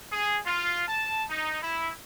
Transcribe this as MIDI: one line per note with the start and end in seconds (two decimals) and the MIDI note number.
0.11 0.38 68
0.45 0.82 65
0.87 1.23 81
1.29 1.58 63
1.62 1.90 64